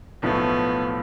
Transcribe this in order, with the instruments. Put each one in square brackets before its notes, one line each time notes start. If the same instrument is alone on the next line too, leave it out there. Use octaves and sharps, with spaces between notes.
[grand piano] B1 A2 F3 A3 [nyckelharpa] B3